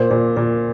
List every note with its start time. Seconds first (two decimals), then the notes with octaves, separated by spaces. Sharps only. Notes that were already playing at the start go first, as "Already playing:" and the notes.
Already playing: A#2 C5
0.11 A#2
0.37 A#2